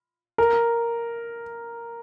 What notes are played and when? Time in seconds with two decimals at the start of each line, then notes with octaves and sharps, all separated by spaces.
0.38 A#4